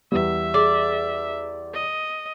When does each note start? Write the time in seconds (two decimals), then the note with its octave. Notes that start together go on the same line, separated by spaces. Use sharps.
0.12 E2 G3 E5
0.54 G#4 D5
1.73 D#5